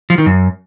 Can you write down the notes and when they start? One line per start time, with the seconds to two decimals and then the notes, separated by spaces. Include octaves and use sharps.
0.10 F3
0.18 D#3
0.26 F#2